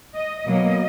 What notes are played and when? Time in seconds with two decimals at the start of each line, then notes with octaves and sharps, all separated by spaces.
0.16 D#5
0.47 B2 F#3 A#3 D#5